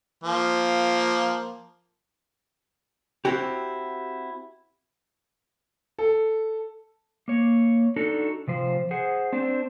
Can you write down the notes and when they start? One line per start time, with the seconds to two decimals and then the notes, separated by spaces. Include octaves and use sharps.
0.24 F3 A#3
3.25 C4 E4 F#4 G4
5.98 A4
7.28 A#3 C#5
7.96 D4 D#4 F#4 A4
8.47 C3 F3 C5
8.91 G#4 C5 F#5
9.33 C4 D4 C5